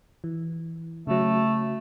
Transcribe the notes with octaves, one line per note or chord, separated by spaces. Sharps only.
E3
C#3 F#3 A3